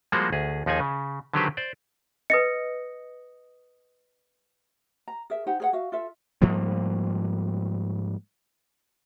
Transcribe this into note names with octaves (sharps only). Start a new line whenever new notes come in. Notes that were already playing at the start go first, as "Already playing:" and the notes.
F3 G3 G#3 A#3 F#4 C5
D2 G#4
D#2 F3 D#4 G#4 G#5
C#3
D3 D#3 F#3 G4 B4 C5
C5 D5
B4 D#5 D#6 A#6 C#7
A#5
G#4 A#4 E5
D#4 G4 C5 F#5
G#4 C5 F#5
F#4 E5 F5
F4 A4 E5
G#2 F3 G3 A#3